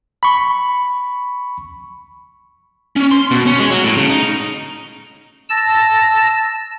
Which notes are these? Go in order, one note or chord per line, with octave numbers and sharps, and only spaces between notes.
B5 C#6
C#4
C6
B2
C#4
G#3
F#3
A2
C#3
D#4
A5 E6 A6 A#6